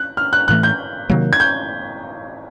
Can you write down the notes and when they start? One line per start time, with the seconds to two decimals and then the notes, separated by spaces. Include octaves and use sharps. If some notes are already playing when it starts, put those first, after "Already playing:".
Already playing: F#6
0.17 F6
0.33 F#6
0.48 A2 E3 A3 F#6
0.63 G6
1.09 C3 D#3 F#3 A#3
1.33 G#6
1.40 G6